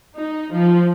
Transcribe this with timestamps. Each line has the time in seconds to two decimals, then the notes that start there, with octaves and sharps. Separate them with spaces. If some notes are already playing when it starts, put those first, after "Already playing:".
0.16 D#4
0.53 F3